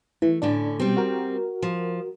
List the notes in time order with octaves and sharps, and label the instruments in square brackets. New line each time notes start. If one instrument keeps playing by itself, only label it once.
[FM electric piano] E3 [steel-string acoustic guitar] A3
[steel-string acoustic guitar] A2 D3 C#4 [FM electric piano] D4
[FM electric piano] B2 [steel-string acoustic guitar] G3 C4
[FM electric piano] F#4 A#4
[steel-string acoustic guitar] F3